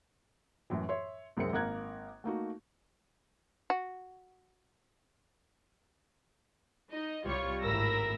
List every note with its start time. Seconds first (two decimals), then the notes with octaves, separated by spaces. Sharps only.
0.70 F#2 A2 E3
0.89 C#5 E5 C6
1.37 C2 F#2 G#3 C4 A#4 C#7
1.53 G#1 A#3 A#4 A#5 F#6 G#6
2.24 A3 A#3 D#4 F#4
3.70 F#4
6.93 D#4 D#5
7.26 C2 G3 F4 C#5 C#6
7.62 G#1 A2 A#4 B5 E6 A#6